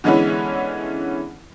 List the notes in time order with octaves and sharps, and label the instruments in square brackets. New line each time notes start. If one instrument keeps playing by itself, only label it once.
[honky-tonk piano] D3 E3 G#3 B3 C#4 E4